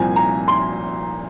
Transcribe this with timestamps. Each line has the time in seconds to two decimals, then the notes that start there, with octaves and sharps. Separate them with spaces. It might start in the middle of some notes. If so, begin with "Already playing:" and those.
Already playing: C2 A#2 F3 C4 G#5
0.16 A#5
0.48 C6